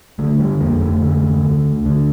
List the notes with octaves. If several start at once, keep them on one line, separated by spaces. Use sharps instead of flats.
D3 A3
G3
F2 A#3
A3
D3 A3
D2
D3